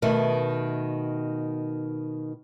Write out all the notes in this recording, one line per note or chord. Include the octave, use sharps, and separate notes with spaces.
B2 D#3 A3